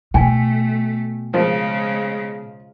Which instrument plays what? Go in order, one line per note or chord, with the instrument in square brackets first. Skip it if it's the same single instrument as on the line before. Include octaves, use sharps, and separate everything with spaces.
[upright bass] B2 [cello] A3 [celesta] G5 G#5
[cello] C#3 G#3 [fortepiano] F3